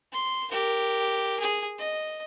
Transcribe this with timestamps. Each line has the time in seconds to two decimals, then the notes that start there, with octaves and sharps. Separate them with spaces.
0.13 C6
0.51 G4 A#4
1.40 G#4
1.78 D#5